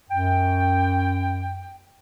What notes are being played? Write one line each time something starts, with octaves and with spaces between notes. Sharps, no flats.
F#2 G5